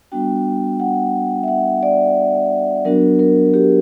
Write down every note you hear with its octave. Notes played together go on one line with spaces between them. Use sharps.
G3 B3 D4 F#4 G5
F#5
E5
F#5
D5
F#3 B3 D4 F#4 A#4
A#4
G4